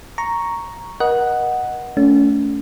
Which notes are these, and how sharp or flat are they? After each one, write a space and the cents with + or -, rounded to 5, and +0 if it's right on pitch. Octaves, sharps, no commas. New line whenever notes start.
A#5 +0 C#6 +0
A#4 +45 D#5 +0 F#5 +0
A3 +0 C#4 +30